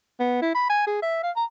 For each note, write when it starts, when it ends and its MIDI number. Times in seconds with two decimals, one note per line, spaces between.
0.19 0.42 59
0.42 0.53 64
0.55 0.69 83
0.70 0.86 80
0.87 0.99 68
1.02 1.18 76
1.23 1.31 77
1.36 1.44 82